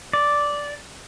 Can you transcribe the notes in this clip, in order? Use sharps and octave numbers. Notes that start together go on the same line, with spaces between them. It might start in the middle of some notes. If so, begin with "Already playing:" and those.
D5